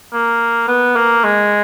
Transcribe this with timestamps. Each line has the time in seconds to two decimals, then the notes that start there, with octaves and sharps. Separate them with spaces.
0.13 A#3
0.68 B3
0.96 A#3
1.24 G#3